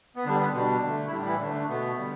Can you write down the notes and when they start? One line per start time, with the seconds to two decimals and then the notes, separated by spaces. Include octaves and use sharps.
0.16 B3
0.25 D3 G3 D4
0.40 B3
0.54 B2 G3 D4
0.83 D3 A3
1.07 E4
1.12 A2 G3 D4
1.26 E3 E4
1.41 D3 A3 D4
1.55 D4
1.69 B2 A3 B3
1.98 D3 G3